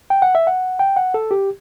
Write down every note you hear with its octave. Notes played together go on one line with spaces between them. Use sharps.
G5
F#5
E5
F#5
G5
F#5
A4
G4